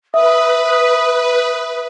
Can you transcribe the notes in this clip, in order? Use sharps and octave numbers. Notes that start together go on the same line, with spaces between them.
B4 E5 D#6